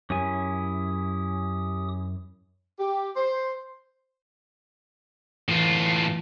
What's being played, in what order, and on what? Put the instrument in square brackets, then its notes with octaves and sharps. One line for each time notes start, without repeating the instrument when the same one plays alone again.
[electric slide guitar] F#2 G#5 [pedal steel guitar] C#4 E4 [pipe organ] G4 D#6
[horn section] G4
C5
[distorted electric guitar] A2 F4 [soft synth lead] E3